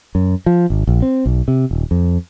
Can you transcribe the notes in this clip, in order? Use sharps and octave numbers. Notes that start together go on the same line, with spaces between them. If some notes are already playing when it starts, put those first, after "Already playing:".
F#2
F3
G#1
A#1
C4
B1
C3
D#1
F2